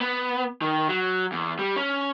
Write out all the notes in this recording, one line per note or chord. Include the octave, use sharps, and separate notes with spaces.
B3
D#3
F#3
E2
G3
C#4